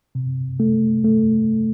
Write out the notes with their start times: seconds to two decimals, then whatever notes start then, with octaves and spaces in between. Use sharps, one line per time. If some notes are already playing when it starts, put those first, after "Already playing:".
0.15 C3
0.60 A3
1.04 A3